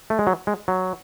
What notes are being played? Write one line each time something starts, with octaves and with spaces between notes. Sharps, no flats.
A3
G#3
F#3
G#3
F#3